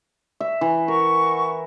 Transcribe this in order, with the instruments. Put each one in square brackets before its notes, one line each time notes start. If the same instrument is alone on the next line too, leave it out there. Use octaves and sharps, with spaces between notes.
[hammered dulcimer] E5
E3
[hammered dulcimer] A#4 [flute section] F#5 C#6